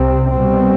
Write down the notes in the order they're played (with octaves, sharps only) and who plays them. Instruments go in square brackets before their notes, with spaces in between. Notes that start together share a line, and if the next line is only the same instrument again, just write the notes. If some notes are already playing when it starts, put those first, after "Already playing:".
Already playing: [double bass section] C2 C3 G3 C4
B2 G3 C4